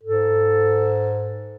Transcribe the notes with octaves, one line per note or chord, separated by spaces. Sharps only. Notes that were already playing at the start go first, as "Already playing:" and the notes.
G#2 A4